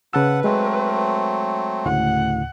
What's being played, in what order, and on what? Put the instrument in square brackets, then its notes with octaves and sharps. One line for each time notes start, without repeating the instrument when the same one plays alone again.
[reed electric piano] C#3 A5 E6 [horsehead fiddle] B4 [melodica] F#5
[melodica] F#3 A3 C4 [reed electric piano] G#3
[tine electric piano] D2 A2 C#3 [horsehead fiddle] F#5